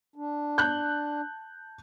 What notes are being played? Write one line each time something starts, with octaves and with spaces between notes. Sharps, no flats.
D4
A5 F#6 G6